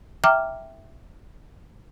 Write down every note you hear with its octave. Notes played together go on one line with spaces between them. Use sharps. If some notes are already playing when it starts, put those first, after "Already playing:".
E5 G5 A#5 D6 F6